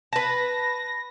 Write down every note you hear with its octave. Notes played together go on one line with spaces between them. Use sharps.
B4 A5 A#6